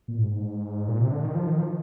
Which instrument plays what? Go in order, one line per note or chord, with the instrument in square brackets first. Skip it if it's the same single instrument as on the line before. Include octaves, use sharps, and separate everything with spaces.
[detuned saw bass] A#2
G#2
A#2
C3
D3
D#3
F3
D#3
F3